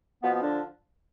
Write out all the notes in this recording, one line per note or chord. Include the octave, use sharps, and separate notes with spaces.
B2 F3 B3
B3
D3 D4